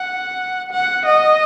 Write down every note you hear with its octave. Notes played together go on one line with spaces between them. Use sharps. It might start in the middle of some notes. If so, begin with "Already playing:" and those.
Already playing: F#5
F#5
D#5